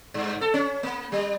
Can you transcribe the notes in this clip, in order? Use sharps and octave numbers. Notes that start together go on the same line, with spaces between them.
G2
A4
C#4
A#3
G3